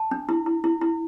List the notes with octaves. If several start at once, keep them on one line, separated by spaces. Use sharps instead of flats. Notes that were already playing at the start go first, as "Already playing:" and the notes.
Already playing: A5
D4
E4
E4
E4
E4